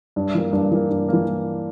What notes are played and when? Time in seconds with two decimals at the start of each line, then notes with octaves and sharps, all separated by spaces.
0.16 G2
0.35 E3 A#3
0.53 G2
0.71 E3 A#3
0.89 G2
1.08 E3 A#3